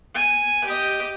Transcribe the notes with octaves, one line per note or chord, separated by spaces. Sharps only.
G#5
G4 D#5